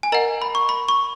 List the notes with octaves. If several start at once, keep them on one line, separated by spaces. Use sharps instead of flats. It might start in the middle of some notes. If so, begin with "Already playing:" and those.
G#5
A#4 D#5 F#5 A#5
B5
C#6
B5
C#6